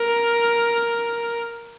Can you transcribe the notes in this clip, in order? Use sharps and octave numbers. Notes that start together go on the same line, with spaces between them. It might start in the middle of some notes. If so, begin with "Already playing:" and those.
Already playing: A#4